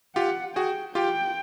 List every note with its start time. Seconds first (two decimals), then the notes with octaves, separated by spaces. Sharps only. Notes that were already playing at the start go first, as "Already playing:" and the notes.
0.16 F4 G4 F#5
0.56 F#4 G#4 G5
0.95 F4 G4 G5